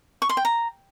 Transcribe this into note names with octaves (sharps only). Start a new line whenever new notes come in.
C#6
C6
G5
A#5